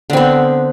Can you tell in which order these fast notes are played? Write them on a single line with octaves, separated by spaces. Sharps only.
D3 C4 B3